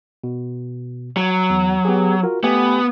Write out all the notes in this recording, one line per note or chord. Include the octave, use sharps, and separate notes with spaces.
B2
F#3
E2
B3 G4 G#4
F4 F#4 A#4
A3 B3 G4 G#5